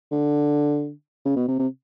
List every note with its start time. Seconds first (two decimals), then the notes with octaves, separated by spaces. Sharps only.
0.12 D3
1.25 C#3
1.36 B2
1.48 C3
1.59 C3